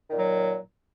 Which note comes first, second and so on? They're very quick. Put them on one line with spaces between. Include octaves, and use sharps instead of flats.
D#3 A#2 F#3